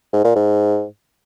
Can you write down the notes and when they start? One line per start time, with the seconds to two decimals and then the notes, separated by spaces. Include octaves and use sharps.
0.13 G#2
0.24 A#2
0.35 G#2